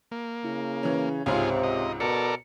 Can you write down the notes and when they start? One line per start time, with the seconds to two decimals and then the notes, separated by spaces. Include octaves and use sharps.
0.12 A#3
0.45 C#3 E4
0.83 E3 C#4
1.26 C#2 G#2 C3 F4 G#4 C5 C#5 F5
1.63 D#5
2.00 B2 A4 A#4 D5 C#7